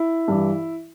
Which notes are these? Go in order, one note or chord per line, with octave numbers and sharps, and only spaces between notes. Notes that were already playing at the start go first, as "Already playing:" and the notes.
Already playing: E4
G2 E3